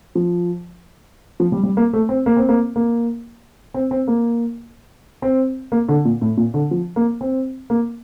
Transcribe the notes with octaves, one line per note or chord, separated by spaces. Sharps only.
F3
F3
G3
G3
A#3
A3
C4
A#3
C4
A#3
A#3
C4
C4
A#3
C4
A#3
D3
A#2
A2
A#2
D3
F3
A#3
C4
A#3